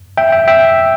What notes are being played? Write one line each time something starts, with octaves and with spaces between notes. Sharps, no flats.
E5 G5
E5 G5
E5 G5